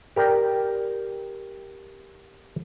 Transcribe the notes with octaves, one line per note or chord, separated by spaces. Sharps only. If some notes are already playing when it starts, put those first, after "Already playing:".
G4 A#4 D5 G5